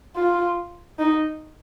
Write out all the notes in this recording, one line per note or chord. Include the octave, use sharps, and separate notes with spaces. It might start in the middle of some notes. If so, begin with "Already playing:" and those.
F4
D#4